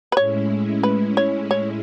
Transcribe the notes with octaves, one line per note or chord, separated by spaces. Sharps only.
B4
A2 G#3 C#4 E4 C#5
B4
C#5
C#5